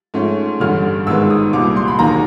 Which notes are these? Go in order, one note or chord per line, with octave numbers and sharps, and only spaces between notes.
G#2 F3 A3 C#4
A1 G2 D3 F6
G#1 G#2 D#3 G#3 B3 E6
D#6
C2 A#2 G3 D6
C6
B5
E1 D#2 D#3 F#3 A#5